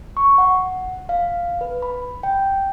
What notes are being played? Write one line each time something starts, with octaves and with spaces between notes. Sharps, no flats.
C#6
F#5
F5
B4
B5
G5